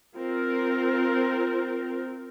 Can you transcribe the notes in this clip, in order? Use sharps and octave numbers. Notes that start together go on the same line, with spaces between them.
C4 F4 A#4